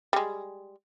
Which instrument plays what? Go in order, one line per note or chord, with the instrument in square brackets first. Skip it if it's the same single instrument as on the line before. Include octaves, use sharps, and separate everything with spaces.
[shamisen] G3 G#3